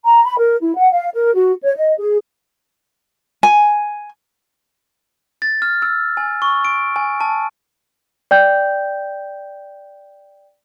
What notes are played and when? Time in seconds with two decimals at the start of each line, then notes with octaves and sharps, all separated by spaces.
0.05 A#5
0.24 B5
0.38 A#4
0.60 E4
0.76 F#5
0.92 F5
1.14 A#4
1.35 F#4
1.63 C#5
1.75 D#5
1.98 G#4
3.43 G#5
5.42 A6
5.62 F6
5.82 E6
6.17 G#5
6.42 C#6
6.65 D7
6.96 G#5
7.20 A5
8.31 D5 G5 G6